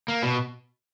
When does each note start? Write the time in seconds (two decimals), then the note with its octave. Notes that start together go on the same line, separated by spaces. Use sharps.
0.08 A#3
0.23 B2